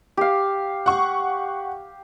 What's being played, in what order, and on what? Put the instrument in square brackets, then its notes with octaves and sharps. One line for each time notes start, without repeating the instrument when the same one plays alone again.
[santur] G4 F5
[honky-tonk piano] F#5 C#6